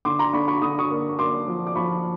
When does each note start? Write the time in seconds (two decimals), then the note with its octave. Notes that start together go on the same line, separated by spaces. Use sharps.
0.05 D3 C6 D6
0.19 A#5 C6
0.33 D3 B5 C#6
0.48 B5 C#6
0.62 D3 D#6
0.79 C#6 D#6
0.91 A#3
1.09 C#6
1.19 A#3 C6 D6
1.48 F3
1.67 D6
1.76 F3 B5 C#6